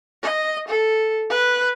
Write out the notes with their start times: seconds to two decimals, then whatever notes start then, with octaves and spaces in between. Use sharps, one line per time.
0.23 D#5
0.68 A4
1.30 B4